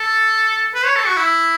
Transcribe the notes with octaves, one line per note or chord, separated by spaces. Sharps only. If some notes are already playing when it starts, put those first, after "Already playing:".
Already playing: A4
B4
C#5
A4
F#4
E4